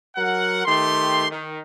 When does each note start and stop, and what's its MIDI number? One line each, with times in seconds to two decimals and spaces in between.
0.16 0.64 54
0.16 0.64 70
0.16 0.64 78
0.65 1.26 51
0.65 1.26 57
0.65 1.26 67
0.65 1.26 84
1.30 1.60 51